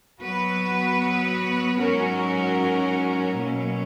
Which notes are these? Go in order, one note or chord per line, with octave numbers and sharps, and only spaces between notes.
F#3 B3 F#4 B4
G#2 F#3 C#4 F#4 A#4
B2 F#3 A#3 C#4